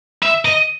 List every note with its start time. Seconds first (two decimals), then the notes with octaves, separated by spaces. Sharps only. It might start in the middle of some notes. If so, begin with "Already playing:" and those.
0.23 E5
0.45 D#5